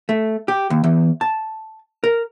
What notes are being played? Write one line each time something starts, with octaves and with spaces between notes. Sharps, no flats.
A3
G4
D#2
E2
A5
A#4